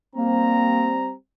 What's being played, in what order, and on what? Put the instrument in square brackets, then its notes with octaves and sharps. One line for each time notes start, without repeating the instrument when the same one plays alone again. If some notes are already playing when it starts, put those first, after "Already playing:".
[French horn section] G3 C4 [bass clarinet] A#3 [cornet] A#5